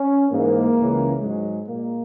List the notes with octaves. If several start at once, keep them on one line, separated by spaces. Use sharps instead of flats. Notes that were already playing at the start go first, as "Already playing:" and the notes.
Already playing: C#4
G#2 E3 G#3 A#3
C#2 C#3 E3 G#3
G#2 F#3 G#3
A#2 G#3 A#3